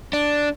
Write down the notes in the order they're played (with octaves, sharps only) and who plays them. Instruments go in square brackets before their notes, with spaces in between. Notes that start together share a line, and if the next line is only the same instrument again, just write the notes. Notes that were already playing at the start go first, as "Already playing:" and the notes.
[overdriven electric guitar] D4